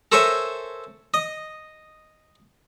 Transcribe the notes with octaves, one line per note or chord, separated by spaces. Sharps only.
A4 A#4 C5 C#5 E5 G#5
D#5